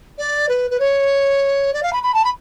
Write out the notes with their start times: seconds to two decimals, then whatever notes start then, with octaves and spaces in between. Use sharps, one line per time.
0.18 D5
0.49 B4
0.71 B4
0.80 C#5
1.74 D5
1.83 F5
1.93 B5
2.03 B5
2.14 A5
2.25 B5